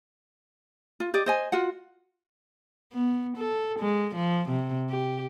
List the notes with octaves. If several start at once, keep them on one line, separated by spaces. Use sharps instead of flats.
F4
G4 D5 D#5
C5 D#5 G#5
F4 F#4 F#5
B3
A4
G#3
F3
C3
G4